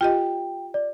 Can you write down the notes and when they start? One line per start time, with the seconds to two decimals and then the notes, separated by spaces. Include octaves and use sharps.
0.01 F4 G4 D#5 G5
0.74 D5